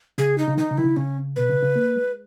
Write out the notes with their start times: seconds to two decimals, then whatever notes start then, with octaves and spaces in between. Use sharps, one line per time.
0.18 C#3 G#4
0.38 D#4
0.48 C#3
0.58 D#3 D#4
0.71 C#3
0.78 D#3 E4
0.84 C#3
0.96 C#3 C#4
1.36 B2 B4
1.50 C#3
1.62 C#3
1.76 A#3
1.96 G#3